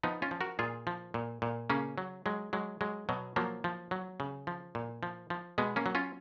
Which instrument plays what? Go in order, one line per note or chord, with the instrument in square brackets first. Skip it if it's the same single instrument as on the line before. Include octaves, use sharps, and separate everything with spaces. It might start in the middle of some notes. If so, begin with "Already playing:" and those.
[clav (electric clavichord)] F3 B3 D#4
C#4 F4
F3
F#4 A#4
A#2 F4 G#4
F3
A#2
A#2
C#3 A#3 C#4
F#3
F#3 G#3
F#3 G#3
F#3 G#3
B2 F#3
F3 F#3 A#3
F3
F#3
C#3
F3
A#2
F3
F3
B2 G#3 B3
A#3 C#4
F#3
C#4 F4